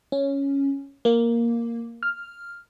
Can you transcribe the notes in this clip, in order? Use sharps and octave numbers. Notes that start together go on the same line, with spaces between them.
C#4
A#3
F6